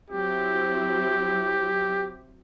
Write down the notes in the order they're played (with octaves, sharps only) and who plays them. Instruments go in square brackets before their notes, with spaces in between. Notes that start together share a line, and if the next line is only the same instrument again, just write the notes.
[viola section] F#3 C4 E4 [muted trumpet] G4